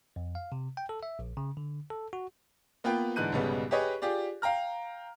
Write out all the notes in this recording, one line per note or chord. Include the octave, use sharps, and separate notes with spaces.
F2
F5
C3
G5
A4
E5
A#1
C#3
D3
A4
F#4
A#3 B3 F4 B4 G5
G#2 D3 E3 F#6 G6 D#7
B1 G#2 C#3 G3 B3
G4 G#4 B4 C#5 D#5
F4 G4 G#4 D5
F5 G5 A#5 F6